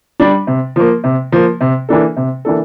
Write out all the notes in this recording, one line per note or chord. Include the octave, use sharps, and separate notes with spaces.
G3 D4
C3
F3 A#3
C3
F3 A#3
C3
E3 A#3 D4 A4
C3
E3 A#3 D4 A4